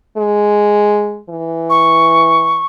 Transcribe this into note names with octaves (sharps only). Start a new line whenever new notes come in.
G#3
E3
C#6